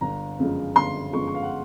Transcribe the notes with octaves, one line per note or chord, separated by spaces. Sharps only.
G1 A#5
F#2 C#3 F3 G#3
G1 C6
F#2 C#3 F3 G#3 C#6
C#6
F5
F#5